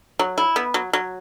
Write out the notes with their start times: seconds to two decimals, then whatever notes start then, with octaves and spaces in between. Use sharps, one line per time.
0.19 F#3
0.38 E4
0.56 B3
0.74 F#3
0.93 F#3